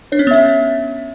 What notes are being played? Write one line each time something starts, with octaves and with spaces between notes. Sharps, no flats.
D4 C#5
C#4
B3
C#4 E5